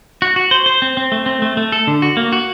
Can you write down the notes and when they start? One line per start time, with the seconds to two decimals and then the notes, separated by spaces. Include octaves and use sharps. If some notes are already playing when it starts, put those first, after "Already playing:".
0.22 F#4
0.36 F#4
0.51 C5
0.66 C5
0.82 C4
0.97 C4
1.12 A3
1.26 C4
1.42 A3
1.57 A3
1.72 A4
1.87 D3
2.02 F#4
2.17 A#3
2.32 F#4